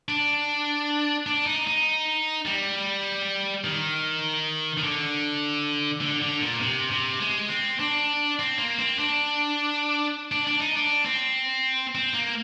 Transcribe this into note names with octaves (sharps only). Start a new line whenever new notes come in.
D4
D4
D#4
D#4
G3
D#3
D#3
D3
D3
D3
A#2
C3
C3
G#3
C4
D4
C4
A#3
C4
D4
D4
D4
D#4
D4
C4
C4
A#3